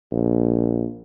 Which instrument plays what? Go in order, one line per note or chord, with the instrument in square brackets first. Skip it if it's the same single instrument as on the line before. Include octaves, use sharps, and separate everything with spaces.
[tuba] A#1